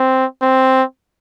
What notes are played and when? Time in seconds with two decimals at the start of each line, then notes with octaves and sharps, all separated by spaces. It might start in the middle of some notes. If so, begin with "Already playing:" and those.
Already playing: C4
0.42 C4